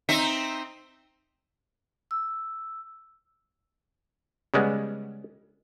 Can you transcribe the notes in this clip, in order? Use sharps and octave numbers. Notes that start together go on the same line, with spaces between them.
C4 D#4 E5
E6
C#3 G3 G#3 B3